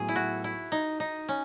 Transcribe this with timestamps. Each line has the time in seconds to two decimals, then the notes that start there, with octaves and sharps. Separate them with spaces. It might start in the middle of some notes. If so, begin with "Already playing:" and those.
Already playing: A2 F#3 B3 G#4
0.09 E4
0.16 F#4
0.44 E4
0.72 D#4
1.00 D#4
1.28 C#4